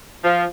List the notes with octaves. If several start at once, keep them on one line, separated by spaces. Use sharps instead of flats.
F3